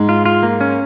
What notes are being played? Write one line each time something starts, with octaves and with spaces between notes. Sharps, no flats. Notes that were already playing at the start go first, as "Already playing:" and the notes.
Already playing: G#2 G#3
F4
F4
A#3
C#4